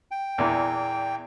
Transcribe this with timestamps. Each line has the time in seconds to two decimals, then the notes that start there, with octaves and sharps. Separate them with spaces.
0.11 G5
0.38 E2 A#2 E3